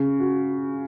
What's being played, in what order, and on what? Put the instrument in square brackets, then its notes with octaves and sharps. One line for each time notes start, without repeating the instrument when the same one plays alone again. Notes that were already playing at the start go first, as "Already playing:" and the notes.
Already playing: [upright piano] C#3
F#4